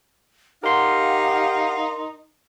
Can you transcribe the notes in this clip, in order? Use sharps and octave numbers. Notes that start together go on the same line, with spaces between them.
D#4 G4 A#4 F5 F#5 C6